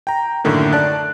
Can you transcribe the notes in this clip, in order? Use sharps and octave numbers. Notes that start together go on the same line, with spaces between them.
G5 A#5
F#2 A2 D3 D#3 A#3
D5 A5 F#6